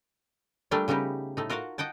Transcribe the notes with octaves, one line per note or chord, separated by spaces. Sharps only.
G3 A3 A#3 D4 F4
C#3 G3 B3 D#4 G4
A2 A3 D#4
F4 F#4 A#4 F5 F#5
D#5 F#5 G5 A5